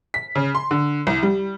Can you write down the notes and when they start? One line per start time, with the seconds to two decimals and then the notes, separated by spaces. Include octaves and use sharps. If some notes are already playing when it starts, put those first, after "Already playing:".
0.14 B6
0.35 C#3
0.55 C6
0.71 D3
1.07 C2
1.23 G3